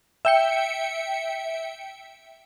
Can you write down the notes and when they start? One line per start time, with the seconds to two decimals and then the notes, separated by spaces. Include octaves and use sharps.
0.25 E5 G5 C#7